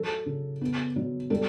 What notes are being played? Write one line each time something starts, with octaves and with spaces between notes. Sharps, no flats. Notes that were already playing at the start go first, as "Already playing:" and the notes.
Already playing: F#3 A4
C#3
B3
F#3
G3 A4